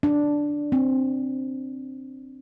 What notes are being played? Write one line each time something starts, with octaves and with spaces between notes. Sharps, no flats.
D4
C4